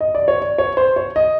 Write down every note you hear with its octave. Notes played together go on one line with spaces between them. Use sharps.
D#5
D5
C#5
D5
C#5
C5
C#5
D#5